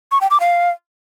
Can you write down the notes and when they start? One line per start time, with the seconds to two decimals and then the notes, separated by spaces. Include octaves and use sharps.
0.12 C#6
0.21 G5
0.31 D6
0.40 F5